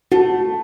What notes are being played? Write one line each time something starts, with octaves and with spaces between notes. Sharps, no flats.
A3 F#4